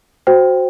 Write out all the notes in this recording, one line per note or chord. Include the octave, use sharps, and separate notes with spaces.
F#4 C5 G5